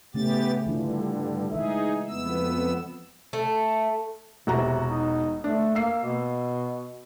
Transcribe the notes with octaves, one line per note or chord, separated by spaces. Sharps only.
C#3 A3 B3 C#4 G4 A6
G2 D3 E3 D4 F4
E3 G#3 D#4 G#4 E5
F2 B3 E6
A3
E1 C3 F#4 A#5
D#4
A3 D4
A#3 E6 C7
B2